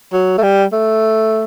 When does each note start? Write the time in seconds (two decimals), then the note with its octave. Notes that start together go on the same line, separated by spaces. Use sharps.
0.13 F#3
0.38 A3
0.43 G3
0.72 A3